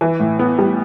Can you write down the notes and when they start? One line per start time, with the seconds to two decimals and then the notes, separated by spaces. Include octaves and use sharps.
0.01 E3
0.20 A2
0.39 B3
0.58 G3